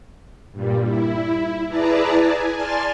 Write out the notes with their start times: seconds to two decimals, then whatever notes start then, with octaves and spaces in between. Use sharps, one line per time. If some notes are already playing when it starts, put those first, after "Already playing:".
0.52 G2 A#2 G3
0.85 E4
1.68 E4 G#4 B4 D5 A5 A#5
2.16 G#5
2.55 D5 G#5 A5 C6 F6 A6